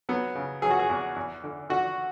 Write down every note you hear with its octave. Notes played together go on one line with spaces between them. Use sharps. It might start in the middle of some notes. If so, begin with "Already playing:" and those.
F#3 B3
C#3
F#3 G#4
F#4
G#4
E2
E2
D3
D3 F#4